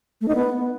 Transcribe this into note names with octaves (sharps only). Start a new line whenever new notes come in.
A3
D#4
B3